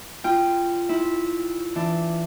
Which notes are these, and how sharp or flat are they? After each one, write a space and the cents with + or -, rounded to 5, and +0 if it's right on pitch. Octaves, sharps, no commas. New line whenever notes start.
F4 -20 G5 +0
E4 -15 C5 +0
E3 +20 D4 +0